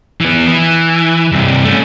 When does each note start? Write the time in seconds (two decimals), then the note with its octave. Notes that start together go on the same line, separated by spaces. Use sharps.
0.21 E3 B3
0.48 E3
1.32 G2 C3
1.64 A3 C#4